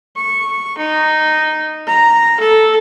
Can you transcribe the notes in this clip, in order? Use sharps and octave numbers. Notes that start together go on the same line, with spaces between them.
C#6
D#4
A#5
A4